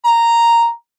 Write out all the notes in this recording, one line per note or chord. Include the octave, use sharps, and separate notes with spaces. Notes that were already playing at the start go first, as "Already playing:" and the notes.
A#5